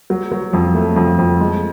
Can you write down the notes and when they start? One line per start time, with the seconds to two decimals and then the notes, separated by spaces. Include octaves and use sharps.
0.10 F#3
0.32 F#3
0.53 F2
0.75 A3
0.96 F2
1.18 F2
1.40 G#3